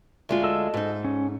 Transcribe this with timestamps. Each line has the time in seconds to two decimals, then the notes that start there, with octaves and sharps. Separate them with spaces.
0.29 D2 G#3 F4
0.44 A4 D#5 E6
0.74 G#2 D#4
1.05 C#4